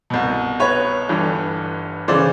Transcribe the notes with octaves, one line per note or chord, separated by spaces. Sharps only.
C2 B2
B4 C#5
G1 G2 E3
C#3 E3 C5 D5